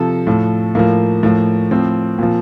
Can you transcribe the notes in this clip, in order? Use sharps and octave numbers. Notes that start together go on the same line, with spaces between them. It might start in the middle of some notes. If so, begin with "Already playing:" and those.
Already playing: C3 F3 A4
A2 F3
A2 F3 A#3
A2 F3
A2 F3 C4
A#2 F3